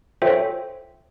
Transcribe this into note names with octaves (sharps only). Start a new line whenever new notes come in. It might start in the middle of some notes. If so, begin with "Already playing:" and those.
F4 A4 C5 C#5 E5 G5